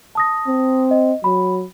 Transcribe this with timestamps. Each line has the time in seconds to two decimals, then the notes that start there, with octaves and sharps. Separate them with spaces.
0.15 A5 D#6 A#6
0.47 C4
0.91 D#5
1.24 F#3 B5